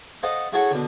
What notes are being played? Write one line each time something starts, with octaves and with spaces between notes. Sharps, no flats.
A4 C5 D#5 F5 F#5
E4 F#4 G#4 A4 C#5 F#5
B2 D3